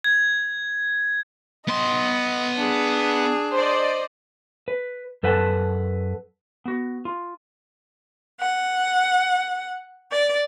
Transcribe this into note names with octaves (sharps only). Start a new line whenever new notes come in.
G#6
B3 D#5 C6
D4 G#4
C5 D5 D#5
B4
F#2 A4 B4 F#5 G#5 A5
B3 F#4
F4
F#5
D5